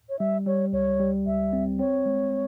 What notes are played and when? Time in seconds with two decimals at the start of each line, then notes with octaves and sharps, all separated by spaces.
0.09 C#5
0.19 G3 E5
0.46 G3 C#5
0.73 C#2 C#5
1.00 G3
1.26 C#2 E5
1.53 C4
1.79 C4 C#5
2.06 G#3